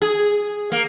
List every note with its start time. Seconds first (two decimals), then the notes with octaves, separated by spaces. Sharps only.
0.02 G#4
0.72 A#3